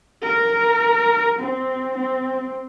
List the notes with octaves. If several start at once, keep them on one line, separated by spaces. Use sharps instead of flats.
A#4
C4
C4